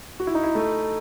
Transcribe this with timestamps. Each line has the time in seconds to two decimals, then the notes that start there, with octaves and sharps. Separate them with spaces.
0.20 F#4
0.27 E4
0.35 D#4
0.43 E4
0.55 A3